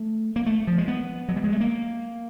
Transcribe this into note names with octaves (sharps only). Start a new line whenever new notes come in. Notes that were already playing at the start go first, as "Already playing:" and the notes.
Already playing: A3
A#3
A3
F3
G#3
B3
F#3
G3
G#3
A3
A#3